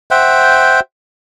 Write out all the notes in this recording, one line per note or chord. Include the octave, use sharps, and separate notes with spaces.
C5 E5 F#5 G5